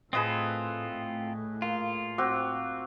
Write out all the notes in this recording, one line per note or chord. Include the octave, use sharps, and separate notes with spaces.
A2 C4 F4 G#4 A4 B4 D#5
A#3 F4
C4 F#4 G5 D6 E6 F#6